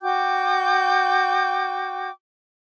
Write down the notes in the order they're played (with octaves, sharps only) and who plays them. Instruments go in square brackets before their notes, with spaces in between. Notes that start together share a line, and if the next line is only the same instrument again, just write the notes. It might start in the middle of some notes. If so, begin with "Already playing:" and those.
[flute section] F#4 G5 D6 G6